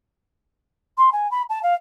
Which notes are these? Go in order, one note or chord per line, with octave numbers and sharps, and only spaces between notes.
C6
G#5
B5
A5
F5